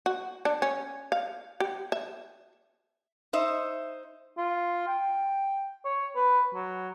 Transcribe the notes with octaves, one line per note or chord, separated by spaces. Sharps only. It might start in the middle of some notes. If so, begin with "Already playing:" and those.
F#4
D4
C#4
F5
G4
E5
D#4 C5 E5
F4
G5
C#5
B4
F#3